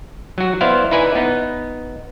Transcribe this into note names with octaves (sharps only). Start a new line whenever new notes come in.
F#3 F#4
B3 E4 C5 D5 F5
D#4 E4 B4 D5 G#5
B3 D#4